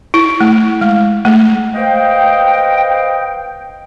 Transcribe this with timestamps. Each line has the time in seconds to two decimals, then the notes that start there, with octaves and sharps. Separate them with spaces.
0.14 E4
0.41 A3
0.81 G#3
1.25 A3
1.74 B4 C5 D#5 F5 G5